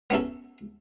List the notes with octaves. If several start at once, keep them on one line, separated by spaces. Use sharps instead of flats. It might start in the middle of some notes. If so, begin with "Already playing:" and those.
B3 C#4 E4 A4